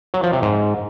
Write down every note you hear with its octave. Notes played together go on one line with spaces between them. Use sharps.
F#3
F3
C3
G#2